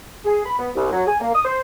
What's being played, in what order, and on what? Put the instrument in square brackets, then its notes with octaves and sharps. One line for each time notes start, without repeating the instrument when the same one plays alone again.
[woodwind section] G#4
B5
B3
C2
F#3
G#5
A#3
D#6
C5